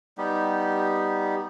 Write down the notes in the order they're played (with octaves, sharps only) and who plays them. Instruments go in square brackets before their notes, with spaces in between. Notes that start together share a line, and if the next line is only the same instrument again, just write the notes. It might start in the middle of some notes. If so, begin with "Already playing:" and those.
[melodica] G3 B3 D#4 G4